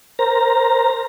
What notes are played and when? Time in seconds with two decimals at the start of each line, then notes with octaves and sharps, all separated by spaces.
0.19 A#4 C5 A#5